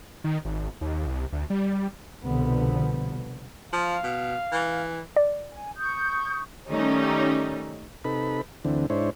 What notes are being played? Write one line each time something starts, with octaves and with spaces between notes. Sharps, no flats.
D#3
G#1
D#2
C2
D2
G3
C2 B2 D3 F3 B3
F3 F5
B2
E3
D5
G#5
C#6 D#6 G6
D#3 G3 A3 C#4 D#4
C3 D#4 A4 B4 B5
D2 D3 E3 C4
G#2 D4 E4 C5 C#5